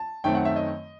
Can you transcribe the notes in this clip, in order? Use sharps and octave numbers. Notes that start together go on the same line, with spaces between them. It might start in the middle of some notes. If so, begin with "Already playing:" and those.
Already playing: A5
F#2 D#3 A3 C4 G5
F#5
E5
D#5